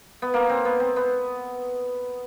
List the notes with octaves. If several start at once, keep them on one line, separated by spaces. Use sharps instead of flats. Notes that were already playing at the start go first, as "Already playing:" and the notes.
B3
A#3
C4
B3
C4
B3